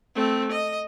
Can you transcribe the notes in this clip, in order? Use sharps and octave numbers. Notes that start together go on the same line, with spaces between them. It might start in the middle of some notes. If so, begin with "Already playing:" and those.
A3 C4
D#5